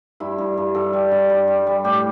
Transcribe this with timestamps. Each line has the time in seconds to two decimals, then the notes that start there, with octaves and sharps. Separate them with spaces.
0.20 G2 E4
0.38 G2
0.57 G2
0.75 G2 A4
0.93 G3
1.11 G2
1.30 G3
1.48 G3
1.67 G3
1.84 A2 G4